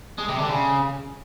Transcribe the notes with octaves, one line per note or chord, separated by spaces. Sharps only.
G#3
C3
D3
C#3